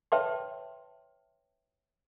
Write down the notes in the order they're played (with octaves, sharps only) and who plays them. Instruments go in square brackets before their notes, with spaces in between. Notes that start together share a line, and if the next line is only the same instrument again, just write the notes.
[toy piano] B4 C#5 E5 G5 A5 C6